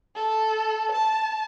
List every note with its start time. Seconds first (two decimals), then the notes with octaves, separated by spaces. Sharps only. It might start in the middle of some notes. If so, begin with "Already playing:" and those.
0.16 A4
0.92 A5